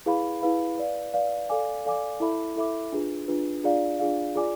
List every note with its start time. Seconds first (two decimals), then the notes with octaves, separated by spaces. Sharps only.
0.06 E4 G#4 B4 F5 B5
0.41 E4 G#4 B4 F5 B5
0.78 B4 D5 F5
1.14 B4 D5 F5
1.49 A4 D5 F5 G#5 D6
1.85 A4 D5 F5 G#5 D6
2.20 E4 A4 E5 B5 D6
2.56 E4 A4 E5 B5 D6
2.92 D4 F4 G#4 B4
3.28 D4 F4 G#4 B4
3.63 D4 F4 G#4 D5 F5
3.99 D4 F4 G#4 D5 F5
4.35 F4 G#4 D5 G#5 D6